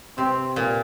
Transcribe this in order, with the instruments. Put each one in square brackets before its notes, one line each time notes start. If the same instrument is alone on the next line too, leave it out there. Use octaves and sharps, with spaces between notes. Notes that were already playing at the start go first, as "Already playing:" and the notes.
[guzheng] C3 [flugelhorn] C4
[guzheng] A#2